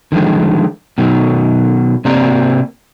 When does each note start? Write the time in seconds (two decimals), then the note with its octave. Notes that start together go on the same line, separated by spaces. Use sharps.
0.12 D3 D#3 F3 G#3
0.98 B2 D#3 F#3
2.05 C3 A#3 C4 G4 D5 A#5